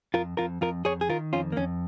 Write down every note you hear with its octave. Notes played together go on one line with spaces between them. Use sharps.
F2 F4 A#4
F2 F4 A#4
F2 F4 A#4
F2 G#4 C#5
G#4
D#3 F4 A#4
F2 C#4 F4
A#3
F2 C#4